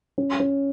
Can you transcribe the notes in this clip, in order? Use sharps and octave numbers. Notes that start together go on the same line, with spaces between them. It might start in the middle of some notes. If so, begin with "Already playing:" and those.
C#4
C#4